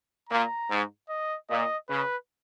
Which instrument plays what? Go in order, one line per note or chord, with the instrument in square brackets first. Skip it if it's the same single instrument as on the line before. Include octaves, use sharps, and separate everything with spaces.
[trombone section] A#2 [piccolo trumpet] A#5
[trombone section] G#2
[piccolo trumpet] D#5
[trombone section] A#2 [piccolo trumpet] D#5
[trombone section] C#3 [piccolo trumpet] B4